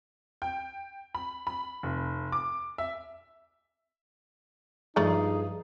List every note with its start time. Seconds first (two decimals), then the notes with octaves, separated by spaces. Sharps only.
0.42 G5
1.15 B5
1.47 B5
1.83 F1
2.32 D6
2.78 E5
4.96 G2 F3 A3 D#4 G#4 D5 A#5